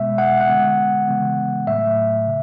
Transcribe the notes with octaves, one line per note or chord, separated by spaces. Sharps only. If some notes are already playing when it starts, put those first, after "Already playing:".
Already playing: B2 G#3 B3 E5
F#5
F#5
D3 G#3 B3
C#3 E3 G#3 B3
A2 F#3 A3 E5
C#3